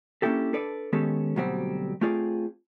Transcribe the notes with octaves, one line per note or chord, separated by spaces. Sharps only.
A#3 C#4 D4 E4 G4 A4
D4 A4 B4 D5
D#3 G#3 B3 C#4 G4 A4
D2 B2 F#3 G3 C4 C5
A3 C4 F4 G#4 D5